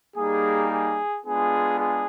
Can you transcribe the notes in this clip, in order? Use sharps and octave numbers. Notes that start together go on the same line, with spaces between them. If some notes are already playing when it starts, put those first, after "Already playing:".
G3 A#3 D#4 G#4
G#4
G#3 B3 D4 F4 G#4
G#4